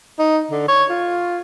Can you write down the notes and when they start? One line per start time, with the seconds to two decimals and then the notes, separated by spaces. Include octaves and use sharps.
0.19 D#4
0.51 D3
0.68 C#5
0.90 F4